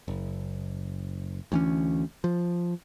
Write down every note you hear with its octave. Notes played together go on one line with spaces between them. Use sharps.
F#1
D2 E3 C#4
F3